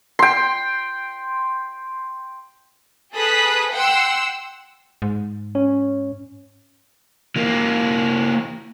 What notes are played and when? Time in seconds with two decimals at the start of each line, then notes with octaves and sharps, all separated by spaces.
0.19 G5 C6
3.14 G#4 A4 B4 D#6 F#6 B6
3.72 F#5 G5 C6 E6
5.02 G#2
5.55 C#4
7.36 E3 A#3